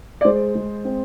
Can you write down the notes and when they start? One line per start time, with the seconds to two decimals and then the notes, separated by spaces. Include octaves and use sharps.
0.21 D5
0.25 G#3 C5
0.55 G#3
0.85 C4